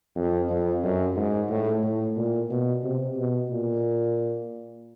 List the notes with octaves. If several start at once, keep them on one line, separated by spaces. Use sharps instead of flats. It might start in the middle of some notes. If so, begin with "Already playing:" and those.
F2
F2
F#2
G#2
A2
A2
A#2
B2
C3
B2
A#2